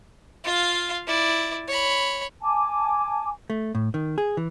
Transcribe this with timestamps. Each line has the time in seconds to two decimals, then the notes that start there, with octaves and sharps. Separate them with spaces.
0.44 F4 F5
1.07 E4 D5
1.68 C#5 B5
2.42 G#5 A5 D6
3.50 A3
3.75 A2
3.94 D#3
4.18 G#4
4.37 E3